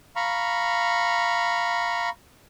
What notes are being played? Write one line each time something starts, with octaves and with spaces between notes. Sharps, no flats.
F5 A#5 B5 C#6